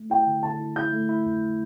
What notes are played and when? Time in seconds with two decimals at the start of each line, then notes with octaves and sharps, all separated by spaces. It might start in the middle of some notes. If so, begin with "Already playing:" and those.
Already playing: A3
0.10 E4 G5
0.27 D3
0.43 D3 A5
0.60 E4
0.76 E4 G6
0.93 A3
1.09 E4
1.26 F2